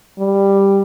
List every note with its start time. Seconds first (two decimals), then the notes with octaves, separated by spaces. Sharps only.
0.19 G3